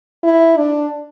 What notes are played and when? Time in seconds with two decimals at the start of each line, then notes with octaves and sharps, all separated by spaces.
0.24 E4
0.57 D4